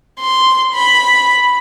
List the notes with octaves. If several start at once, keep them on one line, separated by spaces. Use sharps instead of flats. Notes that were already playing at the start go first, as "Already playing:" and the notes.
C6
B5